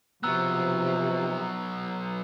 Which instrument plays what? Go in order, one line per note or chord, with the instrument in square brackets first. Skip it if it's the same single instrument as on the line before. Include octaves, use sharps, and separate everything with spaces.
[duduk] C3 [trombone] F3 [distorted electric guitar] F#3 B3 [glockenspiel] A#5 E6 F#6